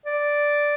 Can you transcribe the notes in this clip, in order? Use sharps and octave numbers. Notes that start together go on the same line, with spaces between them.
D5